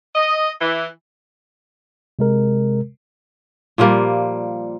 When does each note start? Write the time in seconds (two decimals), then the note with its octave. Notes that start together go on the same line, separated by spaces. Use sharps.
0.15 D#5
0.61 E3
2.19 C3 G#3 A#4
3.78 A#2 F3 G3 A#3